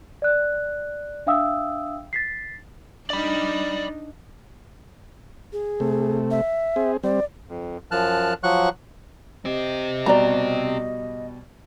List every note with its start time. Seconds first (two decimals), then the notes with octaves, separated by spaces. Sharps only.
0.22 D5 F#6
1.27 D4 E5 F5 G5 D#6 E6
2.13 A6 B6 C7
3.10 D4 D#4 D5 B5
5.53 G#4
5.80 C3 A3
6.31 E5
6.76 C4 G#4
7.04 G3 C4 D5
7.49 F2
7.91 F#2 F3 A5 F6 F#6
8.43 F3 F#3 F#5 C#6 F#6
9.45 C4 G4 D#5
10.06 B2 G3 D5 A#5